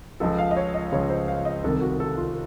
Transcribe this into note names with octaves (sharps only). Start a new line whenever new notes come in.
C#2 C#3 F3 A4
F5
D#5
C#5
D#5
C#2 C#3 F3 C#5
C5
F5
D#5
C2 C3 D#3 A4
F#4
A4
F4